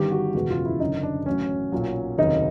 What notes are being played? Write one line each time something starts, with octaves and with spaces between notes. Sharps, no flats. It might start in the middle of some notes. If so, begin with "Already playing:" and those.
Already playing: G1 G2 D#3 G4
F#4
F#1 E2 B2 G#3 F#4
F4
E4
F#1 F#2 D3 D#4
D4
A1 A2 F#3 C#4
B1 A#2 F#3
F1 D#2 C#3 F#3 D#4